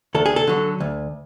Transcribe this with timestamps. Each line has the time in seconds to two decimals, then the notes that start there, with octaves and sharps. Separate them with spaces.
0.15 D2 A4
0.26 G#4
0.36 A4
0.47 D3 F#3
0.80 D2